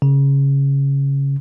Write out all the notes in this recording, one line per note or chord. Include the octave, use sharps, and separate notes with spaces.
C#3